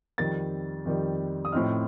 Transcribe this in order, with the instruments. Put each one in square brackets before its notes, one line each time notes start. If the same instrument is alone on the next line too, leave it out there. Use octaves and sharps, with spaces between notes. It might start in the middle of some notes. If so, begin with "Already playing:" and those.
[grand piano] F2 D#3 G3 A6
F2 D#3 G3
D#6
A2 F3 C4 D#4 F6